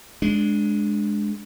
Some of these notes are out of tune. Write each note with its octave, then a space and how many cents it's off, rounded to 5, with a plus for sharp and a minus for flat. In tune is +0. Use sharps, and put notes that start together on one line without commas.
G#3 +10 D4 +0